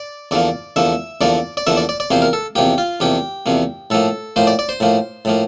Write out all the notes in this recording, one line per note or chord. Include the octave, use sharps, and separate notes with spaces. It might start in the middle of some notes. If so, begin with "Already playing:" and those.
Already playing: D5
E2 D3 F3 A#3 D5
E2 D3 F3 A#3 E5
E2 D3 F3 A#3 D5
D5
E2 D3 F3 A#3 E5
D5
D5
D5
E2 C3 F3 A#3 C5
A#4
A4
E2 C3 F3 A#3 G4
F4
E2 C3 F3 A#3 G4
E2 C3 F3 A#3
A2 F3 A#3 A4
A2 F3 A#3 C5
D5
D5
C5
A2 F3 A#3
A2 F3 A#3